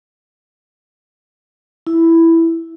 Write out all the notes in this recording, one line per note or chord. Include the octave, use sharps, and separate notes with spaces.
E4